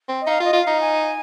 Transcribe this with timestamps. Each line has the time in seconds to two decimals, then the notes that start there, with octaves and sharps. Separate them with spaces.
0.09 C4
0.21 D#5
0.27 D#4 F5
0.40 F4
0.44 D#5
0.53 F4
0.62 F5
0.67 D#4
0.80 G#5